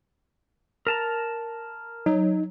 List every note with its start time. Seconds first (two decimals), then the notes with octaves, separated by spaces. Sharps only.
0.87 A#4 A5 A#5
2.06 F#3 D#4